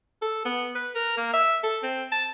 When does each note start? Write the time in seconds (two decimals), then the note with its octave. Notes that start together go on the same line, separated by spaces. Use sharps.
0.22 A4
0.45 B3
0.75 B4
0.95 A#4
1.17 A#3
1.33 E5
1.63 A4
1.83 C4
2.12 A5